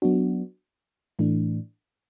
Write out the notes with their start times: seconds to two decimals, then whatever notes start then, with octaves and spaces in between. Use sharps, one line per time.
0.02 F#3 B3 D4 F#4
1.19 A2 E3 A3 D4